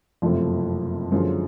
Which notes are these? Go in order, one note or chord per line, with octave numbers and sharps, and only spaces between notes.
F#1 F2 C3 F3 A3
F#2 D3 F3 G#3 C#4